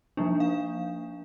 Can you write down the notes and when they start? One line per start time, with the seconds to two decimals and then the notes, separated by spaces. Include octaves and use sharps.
0.17 F3 A#3 D4
0.40 F5